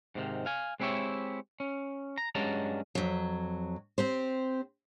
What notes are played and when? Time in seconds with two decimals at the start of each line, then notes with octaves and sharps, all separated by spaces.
0.15 G#2 C3 D#3
0.46 F5 G#5
0.80 G#3 C4 E4 G4 C#5 E5
1.60 C#4
2.18 A#5
2.35 G2 F#3 G#3 C#4 A5 A#5
2.95 F2 F#3
3.98 C4 G4 C5